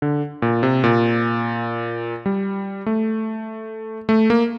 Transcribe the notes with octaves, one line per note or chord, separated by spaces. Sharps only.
D3
A#2
C3
A#2
G3
A3
A3
A#3